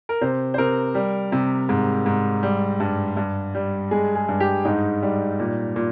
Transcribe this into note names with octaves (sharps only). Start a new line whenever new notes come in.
A#4
C3 C5
C5
C3 A#4
G3
C3
G#2
G#2
G3
G2
G2
G3
G#3 G#4
G#4
G2
G4
G#2 D#4
G3
A#2
A#2